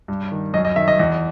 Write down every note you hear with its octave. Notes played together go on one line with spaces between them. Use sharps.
G2
D#3
F#2 D#5
D#5
D#3 E5
D#5
E2 D#5